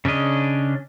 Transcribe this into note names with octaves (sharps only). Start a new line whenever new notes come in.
C#3 C#4 D4 D#5